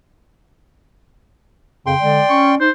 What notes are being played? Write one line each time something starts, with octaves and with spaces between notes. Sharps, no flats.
F2 C#3 G5 C6
D3 G#3 D5
C#4 C#6
D#4 C5